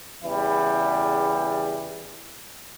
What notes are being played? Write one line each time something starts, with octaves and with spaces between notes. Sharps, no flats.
E2 C#3 E3 G3 E4